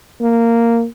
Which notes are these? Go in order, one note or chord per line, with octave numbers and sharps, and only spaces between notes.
A#3